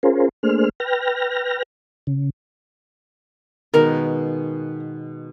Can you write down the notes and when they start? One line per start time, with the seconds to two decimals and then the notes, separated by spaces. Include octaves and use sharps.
0.03 C#4 F4 G#4 A#4 C5
0.43 A3 A#3 D4 G#4 C5 F6
0.80 B4 G5 F6 A#6
2.07 C#3
3.74 B2 D#3 G#3 A#4